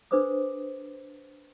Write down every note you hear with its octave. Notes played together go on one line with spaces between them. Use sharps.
D4 A4 B4 C5 D6 D#6